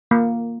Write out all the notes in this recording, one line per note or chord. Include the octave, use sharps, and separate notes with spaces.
A#3